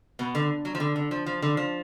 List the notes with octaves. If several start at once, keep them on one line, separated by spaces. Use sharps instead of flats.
B2 B3
D3
F#3
F3
D3
D3
F3
F3
D3
F3